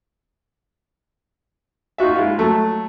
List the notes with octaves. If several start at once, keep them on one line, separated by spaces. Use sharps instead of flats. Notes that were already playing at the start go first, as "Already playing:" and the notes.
D#4 F4 F#4 E5
G#3 E4 F4
F#3 A3